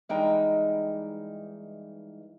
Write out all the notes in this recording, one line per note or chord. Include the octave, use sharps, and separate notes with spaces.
G2 E3 G#3 D#4 A#4 G5